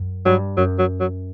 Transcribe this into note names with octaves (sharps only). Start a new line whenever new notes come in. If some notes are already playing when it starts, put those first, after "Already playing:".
Already playing: F#2
G2 F#3
F#2 F#3
F#3
F#3